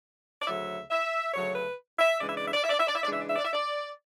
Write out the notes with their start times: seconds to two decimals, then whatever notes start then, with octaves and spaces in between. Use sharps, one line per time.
0.42 D5
0.47 D2 C#3 F#3 A3 E5
0.91 E5
1.34 D2 C#3 F#3 A3 C#5
1.55 B4
1.99 E5
2.20 C#3 E3 G#3 D4 D5
2.29 E5
2.37 D5
2.45 E5
2.53 D5
2.62 E5
2.70 D5
2.78 E5
2.87 D5
2.95 E5
3.03 D5
3.07 C#3 E3 G#3 D4 E5
3.20 D5
3.28 E5
3.36 D5
3.45 E5
3.53 D5